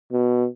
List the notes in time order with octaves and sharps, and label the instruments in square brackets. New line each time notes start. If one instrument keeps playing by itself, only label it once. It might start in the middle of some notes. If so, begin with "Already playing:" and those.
[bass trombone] B2